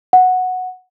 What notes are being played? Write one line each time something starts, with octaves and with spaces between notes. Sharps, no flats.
F#5